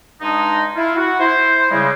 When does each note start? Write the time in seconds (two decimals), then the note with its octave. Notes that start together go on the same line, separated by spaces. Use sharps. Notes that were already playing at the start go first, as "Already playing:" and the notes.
0.21 G2 G#3 D4 D#4
0.76 E4 F4
0.97 F#4
1.20 E4 C5
1.71 C#3 G3 G#3